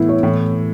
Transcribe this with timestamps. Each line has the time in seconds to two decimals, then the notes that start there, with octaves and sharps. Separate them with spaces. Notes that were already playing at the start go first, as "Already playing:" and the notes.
Already playing: A2 E3 B3 E4
0.09 C#5
0.23 A2 E3